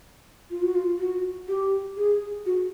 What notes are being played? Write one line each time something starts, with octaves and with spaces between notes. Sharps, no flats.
F4
F#4
F4
F#4
G4
G#4
F#4